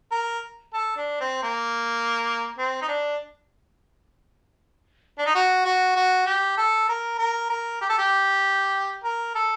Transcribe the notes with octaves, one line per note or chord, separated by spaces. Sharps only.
A#4
A4
D4
C4
A#3
C4
D#4
D4
D4
D#4
F#4
F#4
F#4
G4
A4
A#4
A#4
A#4
G4
A4
G4
A#4
A4